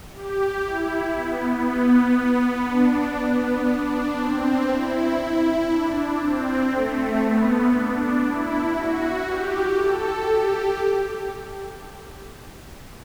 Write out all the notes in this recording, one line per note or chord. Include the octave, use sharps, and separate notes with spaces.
G4
E4
B3
B3
D4
B3
D4
C4
E4
D4
C4
A3
B3
D4
E4
F#4
G4
A4
G4